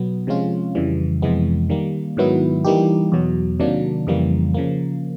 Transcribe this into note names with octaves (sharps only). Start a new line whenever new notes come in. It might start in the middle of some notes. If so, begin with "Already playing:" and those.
Already playing: B2 F#3 B3
C3 F3 G#3 C#4 F4
F2 C#3 E3 G3
F2 C3 E3 G#3 B3
D#3 G3 A#3
G#2 D#3 F#3 B3 E4
E3 G3 A#3 D#4 G4
E2 B2 F#3
C3 D#3 F#3 A#3 D4
F2 C#3 E3 G3 A#3
C#3 F3 A#3